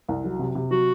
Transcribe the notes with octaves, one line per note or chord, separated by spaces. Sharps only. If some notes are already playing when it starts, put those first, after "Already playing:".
C2
F#3
C3
C3
F#3 F#4